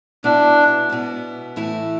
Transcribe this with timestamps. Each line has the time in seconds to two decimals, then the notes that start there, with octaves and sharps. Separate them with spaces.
0.24 B2 B3 D4 E4
0.90 B2 B3 E4
1.56 A2 E3 A3 E4